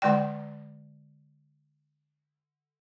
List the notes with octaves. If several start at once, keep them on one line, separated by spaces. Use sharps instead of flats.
D3 G#3 D5 G5